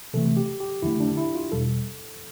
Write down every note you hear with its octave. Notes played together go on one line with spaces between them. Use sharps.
C3 E3 A3 A4
G4
G4
F2 D3 A3 E4
D4
E4
F4
E2 B2 G3 A4